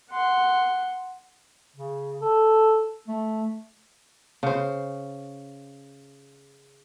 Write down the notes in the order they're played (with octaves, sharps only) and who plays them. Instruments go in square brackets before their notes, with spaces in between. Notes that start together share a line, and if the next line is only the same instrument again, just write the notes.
[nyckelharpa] F#5 C6
[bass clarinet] C#3
A4
A3
[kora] C#3 C5